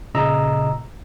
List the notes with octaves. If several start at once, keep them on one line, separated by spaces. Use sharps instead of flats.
A#2 C#3 D#5 A#5 E6